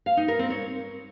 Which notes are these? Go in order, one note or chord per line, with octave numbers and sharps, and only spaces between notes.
F5
D#4
A#4
C4
C#5